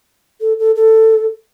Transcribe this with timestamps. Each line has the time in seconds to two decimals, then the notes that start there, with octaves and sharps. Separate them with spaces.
0.41 A4
0.59 A4
0.76 A4